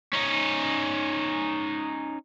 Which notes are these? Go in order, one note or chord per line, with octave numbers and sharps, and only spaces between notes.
C#4 D#4